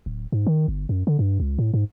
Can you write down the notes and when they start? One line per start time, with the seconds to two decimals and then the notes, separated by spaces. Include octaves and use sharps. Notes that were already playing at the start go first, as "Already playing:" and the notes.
0.06 D1
0.32 G#2
0.47 D#3
0.68 G1
0.89 F#2
1.07 D3
1.19 G2
1.40 C#2
1.59 A2
1.74 G#2